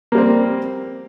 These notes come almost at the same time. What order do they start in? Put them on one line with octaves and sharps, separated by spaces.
A#3 G3 C4